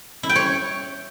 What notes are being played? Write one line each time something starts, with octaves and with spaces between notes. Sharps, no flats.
E4
G5
C#5